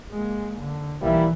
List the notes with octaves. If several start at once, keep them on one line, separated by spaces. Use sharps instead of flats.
G#3 A#3
D3
B1 E3 G3 A#3 E4